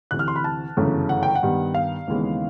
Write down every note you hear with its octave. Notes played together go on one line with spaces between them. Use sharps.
D2 C3 E3 F#6
F6
C6
B5
A5
G1 F#2 C#3 E3 A3
F#5
G5
F#5
G2 D#3 G3 B3
F5
D#2 C#3 E3 G#3 B3